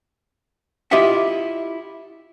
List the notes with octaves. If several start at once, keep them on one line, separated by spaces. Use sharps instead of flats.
E4 F4 G4 D#5 E5 F#5